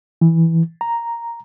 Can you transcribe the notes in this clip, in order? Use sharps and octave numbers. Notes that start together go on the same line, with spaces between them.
E3
A#5